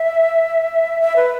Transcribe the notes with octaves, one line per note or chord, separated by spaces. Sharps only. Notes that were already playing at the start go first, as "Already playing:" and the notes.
Already playing: E5
E5
B4